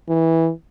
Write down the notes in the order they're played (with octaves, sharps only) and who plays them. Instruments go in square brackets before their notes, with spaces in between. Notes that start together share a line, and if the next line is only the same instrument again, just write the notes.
[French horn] E3